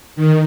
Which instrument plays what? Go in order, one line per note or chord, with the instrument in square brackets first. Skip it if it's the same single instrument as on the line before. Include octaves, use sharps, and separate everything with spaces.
[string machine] D#3